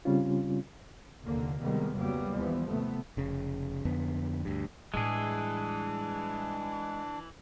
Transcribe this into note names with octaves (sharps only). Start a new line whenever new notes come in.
C#3 G3 C4 C#4 F4
F1 D#2 D3 A#3
C3 D#3 G3 G#3 A#3 B3
F1 C#3 F#3 G3 A#3 B3
D#2 E3 F3 B3
C3 A3 B3
F1 C#3
F2 D3 B3
D2 G2
A2 E3 G3 G#3 D4 G#4